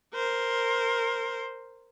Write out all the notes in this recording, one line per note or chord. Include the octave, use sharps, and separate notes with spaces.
A#4 C5